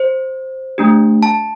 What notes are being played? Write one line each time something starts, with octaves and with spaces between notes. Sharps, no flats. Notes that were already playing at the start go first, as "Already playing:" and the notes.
Already playing: C5
A3 D4 G4
A5